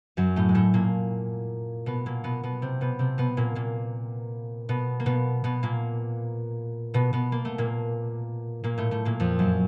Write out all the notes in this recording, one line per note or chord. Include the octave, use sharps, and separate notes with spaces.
F#2 F#3
A2 A3
G#3
A2 A3
A#2 A#3
B2 B3
A#2 A#3
B2 B3
B2 B3
C3 C4
B2 B3
C3 C4
B2 B3
A#2 A#3
A#2 A#3
B2 B3
A#3
B2 B3
B2 B3
A#2 A#3
B2 B3
B2 B3
A#3
A3
A#2 A#3
A#2 A#3
A2 A3
A2 A3
A#2 A#3
F2 F3
F#2 F#3